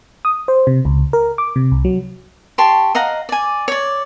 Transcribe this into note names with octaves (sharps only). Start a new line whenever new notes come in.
D#6
C5
C3
C#2
A#4
D6
C3
C2
F#3
G4 A5 C6 C#6
D#5 F5 F#5 A#5
D5 G#5
C#5 D5